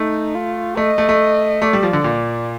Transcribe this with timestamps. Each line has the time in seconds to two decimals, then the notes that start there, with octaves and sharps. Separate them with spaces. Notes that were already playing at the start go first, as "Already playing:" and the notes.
Already playing: A3 D#4
0.35 F4
0.77 A3 D#5
0.98 A3
1.09 A3
1.62 A3 D5
1.73 G3
1.83 F3
1.93 D3
2.04 A#2